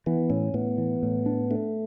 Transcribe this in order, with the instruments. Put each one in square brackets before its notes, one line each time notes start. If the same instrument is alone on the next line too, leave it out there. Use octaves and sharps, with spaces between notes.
[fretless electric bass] E3 [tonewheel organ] B3
[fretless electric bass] A2 [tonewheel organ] C#4
[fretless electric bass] A2 [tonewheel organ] B3
[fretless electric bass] E3
A2
D4
[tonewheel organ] A3 [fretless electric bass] D4